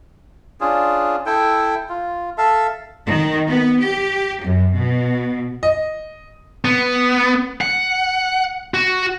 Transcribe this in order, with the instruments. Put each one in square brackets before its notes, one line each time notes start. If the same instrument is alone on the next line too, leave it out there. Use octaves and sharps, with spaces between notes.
[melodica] C#4 D4 F4 G#4
E4 A4 G5
F4
A4 E5 F5 A5
[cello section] D#3
B3
G4
F#2
B2
[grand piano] D#5
[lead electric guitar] B3
F#5
F#4